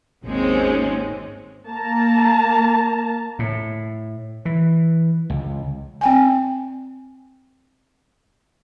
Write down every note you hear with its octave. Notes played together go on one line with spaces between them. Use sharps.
G#1 D#2 G#3 C4 C#4
A#3 A5 A#5
A2
E3
C#2
C4 G5 G#5